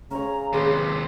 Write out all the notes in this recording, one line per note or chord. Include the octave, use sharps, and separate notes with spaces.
C#3 C#4 C#5 A#5
D#2 C3 G#4 B4 C6